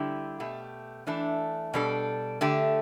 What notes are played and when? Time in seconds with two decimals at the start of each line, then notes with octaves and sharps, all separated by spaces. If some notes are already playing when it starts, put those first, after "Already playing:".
Already playing: D3 G3 E4 G4
0.40 B2 A3 G4
1.07 E3 A3 D4 A4
1.74 B2 G3 D4 A4
2.41 D3 A3 G4